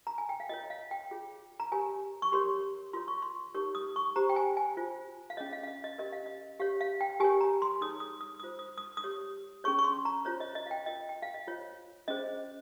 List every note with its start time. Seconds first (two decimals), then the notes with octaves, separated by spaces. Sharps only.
0.07 A#5
0.18 G#5
0.29 G5
0.40 F5
0.49 F4 A#4 C#5 D#5
0.70 F5
0.91 G5
1.11 F4 G#4 C#5
1.60 A#5
1.72 G4 A#4 C#5 G#5
2.22 C#6
2.32 G4 A#4 C#5 C6
2.93 F4 A#4 C#5 C6
3.08 C#6
3.22 C6
3.55 D#4 G4 A#4 C#5 C#6
3.75 D#6
3.96 C#6
4.16 G4 C5 A#5
4.29 G5
4.36 G#5
4.57 G#5
4.77 F4 C5
5.30 F5
5.37 C#4 G#4 C#5 D#5
5.53 F5
5.63 F5
5.68 D#5
5.84 D#5
5.98 C#4 G4 A#4 D#5
6.12 F5
6.26 D#5
6.60 G4 C#5 F5
6.81 F5
7.01 G5
7.20 G4 A#4 C#5 G#5
7.41 A#5
7.62 C6
7.81 D#4 G#4 C#5 D#6
8.00 D#6
8.21 D#6
8.40 F4 C5 D#6
8.59 D#6
8.78 D#6
8.97 D#6
9.04 G4 C#5
9.64 C#4 G#4 C#5 C#6
9.79 C#6
9.84 C6
10.05 A#5
10.25 F4 C5 C#5
10.40 D#5
10.55 D#5
10.66 F5
10.71 G5
10.86 F4 A#4 C#5 D#5
11.09 G5
11.22 F5
11.34 D#5
11.47 F4 C5 C#5
12.08 C#4 G#4 C5 D#5